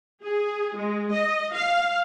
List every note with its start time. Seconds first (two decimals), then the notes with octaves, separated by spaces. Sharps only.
0.23 G#4
0.76 G#3
1.12 D#5
1.54 F5